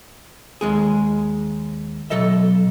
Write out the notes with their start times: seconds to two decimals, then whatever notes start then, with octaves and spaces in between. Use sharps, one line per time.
0.61 D#2 G#3 G#4
2.10 B1 E2 F#3 A4 D#5 E5